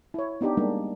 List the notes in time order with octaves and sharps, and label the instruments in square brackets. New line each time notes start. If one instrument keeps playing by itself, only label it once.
[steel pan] E4 C#5
B3 D4 D#4 G4
G3 G#3 A#3 D4 D#4